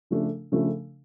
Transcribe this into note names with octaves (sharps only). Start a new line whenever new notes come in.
C#3 F3 A3 D4
C#3 F3 A3 D4